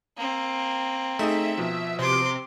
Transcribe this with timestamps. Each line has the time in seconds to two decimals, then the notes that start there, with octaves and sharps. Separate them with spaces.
0.18 A#3 C4
1.19 A3 D#4 G#4 E5
1.58 B2 F3
1.99 C3 C6 D6